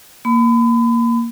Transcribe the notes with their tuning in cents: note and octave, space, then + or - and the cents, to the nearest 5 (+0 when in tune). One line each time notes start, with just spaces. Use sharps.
A#3 +0 B5 +35